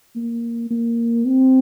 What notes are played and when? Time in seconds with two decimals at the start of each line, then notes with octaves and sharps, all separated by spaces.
0.16 A#3
0.70 A#3
1.26 C4